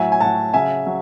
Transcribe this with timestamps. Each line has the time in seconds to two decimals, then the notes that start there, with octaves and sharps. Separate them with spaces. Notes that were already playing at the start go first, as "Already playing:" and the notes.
Already playing: A2 F#3 E5 G#5
0.12 G#5
0.20 A2 F#3 F#5 A5
0.53 C#3 F#3 E5 G#5
0.87 F#3